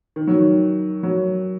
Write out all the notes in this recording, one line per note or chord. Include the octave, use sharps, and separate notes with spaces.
D#3
F#3
D#3
F#3